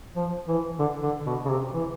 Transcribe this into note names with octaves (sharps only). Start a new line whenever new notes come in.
F3
E3
D3
D3
B2
C#3
C3
E3